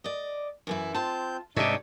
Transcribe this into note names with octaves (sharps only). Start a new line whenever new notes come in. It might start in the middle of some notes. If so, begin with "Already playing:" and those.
D5 D#5
F#2 E3 E4
C4 F4 A5 G6
G#2 C3 G3 D4 D#4 G4 C#5 E5